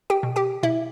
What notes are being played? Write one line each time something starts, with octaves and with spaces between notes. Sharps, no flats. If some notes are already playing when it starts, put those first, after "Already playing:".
G4 G5
B2
G4 G5
B2 E4 E5